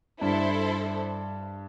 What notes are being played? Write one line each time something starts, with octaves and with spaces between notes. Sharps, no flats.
G2 E4 A4 C5